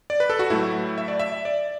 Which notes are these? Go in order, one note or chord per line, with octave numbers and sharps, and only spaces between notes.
D5
B4
A4
F#4
A2 F#3 A3 E4
E5
D5
E5
D5